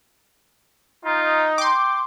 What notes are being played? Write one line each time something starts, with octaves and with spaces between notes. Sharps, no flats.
D#4 F4
G5 C6 D6